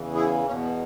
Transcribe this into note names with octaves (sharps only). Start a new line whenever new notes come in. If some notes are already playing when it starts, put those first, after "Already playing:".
Already playing: E2 C#3 E3
E4 G#4
E2 B2 A#3 C#4
B3